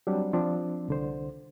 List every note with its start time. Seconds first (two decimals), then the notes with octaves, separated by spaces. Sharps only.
0.07 F#3 G3 C4 D4
0.33 F3 C4 D4
0.88 C2 D3 C5